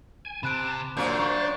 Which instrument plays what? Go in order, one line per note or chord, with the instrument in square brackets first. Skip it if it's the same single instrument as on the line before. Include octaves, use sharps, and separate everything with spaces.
[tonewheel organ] G#5
[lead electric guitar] C3 [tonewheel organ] A5 [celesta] B5 F#6 D7
[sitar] F#2 F4 [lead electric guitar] A#3 D4 [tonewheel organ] C5
[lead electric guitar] D4 [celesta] C#6